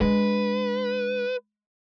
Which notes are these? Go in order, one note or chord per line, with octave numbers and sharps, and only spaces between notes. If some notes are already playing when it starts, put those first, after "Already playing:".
G#3 D4 B4